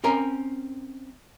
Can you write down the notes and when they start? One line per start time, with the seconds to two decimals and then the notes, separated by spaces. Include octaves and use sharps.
0.04 C4 C#4 A#4 G#5